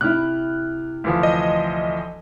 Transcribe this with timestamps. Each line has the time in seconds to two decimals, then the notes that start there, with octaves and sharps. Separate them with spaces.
0.01 C3 E4 F6 F#6
1.04 D2 E3 F3
1.23 D#5